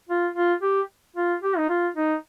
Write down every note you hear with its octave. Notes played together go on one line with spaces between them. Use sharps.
F4
F4
G4
F4
G4
D#4
F4
D#4